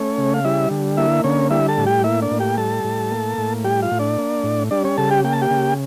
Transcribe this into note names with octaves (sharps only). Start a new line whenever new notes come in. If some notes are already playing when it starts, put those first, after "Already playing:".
Already playing: A3 C#4 C#5
C#3
F5
G3 E4 E5
D3
A#3 E4 E5
D3 C#4 C#5
G3 E4 E5
A4 A5
A2
G4 G5
A#3 E4 E5
D4 D5
A2
G4 G5
G3 A4 A5
A2
A#3
A2
G3 G4 G5
F4 F5
A2
D4 D5
A#3
A2
G3 D4 D5
C#4 C#5
C#3 A4 A5
G4 G5
A#3 G5
A5
G4 G5
C#3